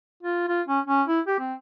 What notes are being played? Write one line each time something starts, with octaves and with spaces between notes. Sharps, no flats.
F4
F4
C#4
C#4
E4
G4
C4